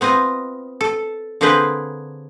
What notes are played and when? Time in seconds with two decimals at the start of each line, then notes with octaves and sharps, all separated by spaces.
0.01 B3 C4 F4 D#5
0.81 A4
1.41 D3 A#3 C4 G#4 B4 C5